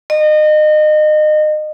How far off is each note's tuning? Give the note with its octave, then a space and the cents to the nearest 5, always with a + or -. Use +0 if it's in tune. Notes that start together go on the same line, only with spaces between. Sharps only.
D#5 -30